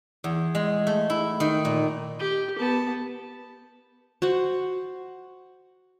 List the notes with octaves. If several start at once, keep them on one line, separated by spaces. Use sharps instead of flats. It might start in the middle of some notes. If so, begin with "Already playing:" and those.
E2
G#3
A3
E4
D#3
A#2
G4
B3 A5
F#4 C5 F#5